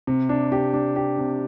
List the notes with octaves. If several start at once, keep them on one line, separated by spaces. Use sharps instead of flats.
C3
D4
G4
D4
G4
C3